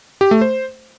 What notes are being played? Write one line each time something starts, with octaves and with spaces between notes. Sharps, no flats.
G4
A3
C5